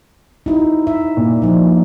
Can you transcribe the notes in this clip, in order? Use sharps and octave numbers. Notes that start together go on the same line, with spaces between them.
D#4 E4 F#4
E5
A#2
F3 D#4